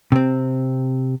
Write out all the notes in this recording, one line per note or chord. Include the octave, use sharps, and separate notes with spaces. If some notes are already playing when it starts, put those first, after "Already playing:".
C3 C4